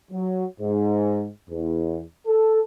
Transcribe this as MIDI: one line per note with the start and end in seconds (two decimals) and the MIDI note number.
0.11 0.45 54
0.60 1.26 44
1.49 2.01 40
2.26 2.60 69